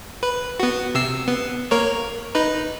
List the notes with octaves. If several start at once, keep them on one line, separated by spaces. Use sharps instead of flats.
B4
B3 F#4
C3 E6 C7
B3
A#3 A#4 C#5
D#4 B4